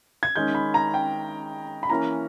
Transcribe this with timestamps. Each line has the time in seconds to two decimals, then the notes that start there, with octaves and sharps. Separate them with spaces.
0.23 G#6
0.36 D#3 G#3 C#4 G6
0.55 B5
0.74 A#5
0.94 G5
1.83 B5
1.90 E3 A#3 C#4 A#5